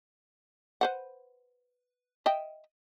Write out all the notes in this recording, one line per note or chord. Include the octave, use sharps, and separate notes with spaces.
B4 C5 F#5
D#5 E5 G5